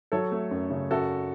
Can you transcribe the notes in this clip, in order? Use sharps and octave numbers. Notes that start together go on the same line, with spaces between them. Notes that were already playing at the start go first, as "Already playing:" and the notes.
F#3 A4 C#5
A3
F#2
C#3
F#2 F#4 A4